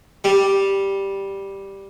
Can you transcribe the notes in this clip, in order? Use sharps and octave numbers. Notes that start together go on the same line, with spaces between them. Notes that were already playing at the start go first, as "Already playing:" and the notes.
G3